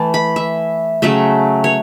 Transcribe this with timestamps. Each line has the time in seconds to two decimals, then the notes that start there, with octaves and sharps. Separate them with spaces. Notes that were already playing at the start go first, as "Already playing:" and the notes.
Already playing: E3 A3 A5
0.14 B5
0.36 E5
1.02 C#3 F#3 A3 E5
1.64 C#5